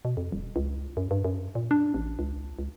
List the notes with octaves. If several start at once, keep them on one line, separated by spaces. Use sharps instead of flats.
B2
F2
D#1
C#2
F#2
G2
F#2
A#2
D4
A1
C#2
C#2